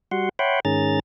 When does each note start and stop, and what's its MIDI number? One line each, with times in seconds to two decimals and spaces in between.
0.11 0.29 55
0.11 0.29 66
0.11 0.29 78
0.11 0.29 84
0.39 0.60 73
0.39 0.60 76
0.39 0.60 78
0.39 0.60 79
0.39 0.60 83
0.39 0.60 84
0.65 1.00 44
0.65 1.00 51
0.65 1.00 61
0.65 1.00 68
0.65 1.00 82
0.65 1.00 93